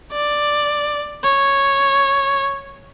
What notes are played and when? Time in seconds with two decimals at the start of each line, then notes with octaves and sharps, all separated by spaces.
0.13 D5
1.24 C#5